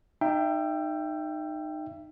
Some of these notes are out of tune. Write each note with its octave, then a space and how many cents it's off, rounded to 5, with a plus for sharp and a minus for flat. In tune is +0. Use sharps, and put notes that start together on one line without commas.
D#4 -20 E5 +30 G5 +0